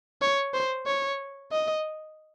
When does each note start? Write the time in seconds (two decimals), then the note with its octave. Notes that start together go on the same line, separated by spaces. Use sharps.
0.22 C#5
0.54 C5
0.87 C#5
1.52 D#5